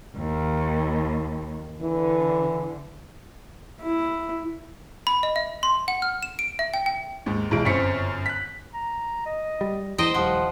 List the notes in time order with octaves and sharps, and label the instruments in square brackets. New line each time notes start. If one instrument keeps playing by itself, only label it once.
[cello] D#2
[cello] D3 [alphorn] E3
[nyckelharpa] E4
[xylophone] B5
D#5
E5
C6
F#5
F6
E7
D7
E5
G5
G5
[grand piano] D#2 G#2
B1 E3 G#3 D7
G1 F#2 C4 C#6 B6 C#7
F#6 B6
[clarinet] A#5
D#5
[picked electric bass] G3
[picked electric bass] E2 [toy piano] E4 [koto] C5 D#5 G5 [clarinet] D#6
[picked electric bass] D#1 G3 [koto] F3 [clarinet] F#5